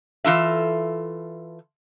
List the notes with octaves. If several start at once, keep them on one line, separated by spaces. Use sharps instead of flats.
E3 F4 A4 E5